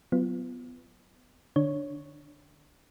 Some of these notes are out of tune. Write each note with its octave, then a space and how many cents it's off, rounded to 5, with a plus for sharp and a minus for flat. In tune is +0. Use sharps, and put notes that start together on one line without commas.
F#3 +5 B3 +20 F4 -25
D3 +25 D4 +0 C#5 +0